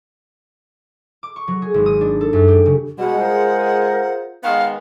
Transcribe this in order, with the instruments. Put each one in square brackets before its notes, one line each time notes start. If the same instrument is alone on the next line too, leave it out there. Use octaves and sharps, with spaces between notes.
[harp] D6
C#6
F#3
G#4
G#1
D#6
D4
A4
F#2
G4
C#3
[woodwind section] B2 G3 [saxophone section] G#3 [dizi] F#5
[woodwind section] F4 G#4 C5 [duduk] A#4
[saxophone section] D#3 G#3 B3 [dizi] F5